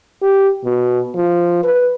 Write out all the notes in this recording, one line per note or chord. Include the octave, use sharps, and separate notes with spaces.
G4
B2
F3
B4